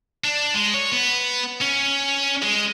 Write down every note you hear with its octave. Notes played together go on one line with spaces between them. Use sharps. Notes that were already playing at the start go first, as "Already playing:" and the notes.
D4
G#3
C#5
B3
C#4
G#3